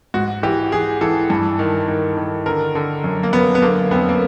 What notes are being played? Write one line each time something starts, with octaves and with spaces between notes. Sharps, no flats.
G#2 F#4
E3 G4
E3 G#4
E3 A4
G2
D#3
D#3
D#3
D3 A#4
D3
F#2
A#3
F#2 B3
B3
D3 A#3
F2 B3
A#3